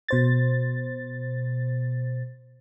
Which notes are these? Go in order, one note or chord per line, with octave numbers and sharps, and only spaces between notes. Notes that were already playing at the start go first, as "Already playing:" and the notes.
B2 C5 A6